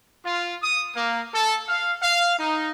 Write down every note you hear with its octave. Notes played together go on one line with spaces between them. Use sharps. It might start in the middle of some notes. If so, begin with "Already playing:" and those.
F4
D#6
A#3
A4
F5
F5
D#4